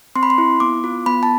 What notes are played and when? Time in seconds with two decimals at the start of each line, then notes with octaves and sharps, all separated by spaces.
0.16 C4 C6
0.23 B5
0.30 C6
0.38 E4
0.60 B3 D6
0.84 F4
1.06 B3 B5
1.23 A5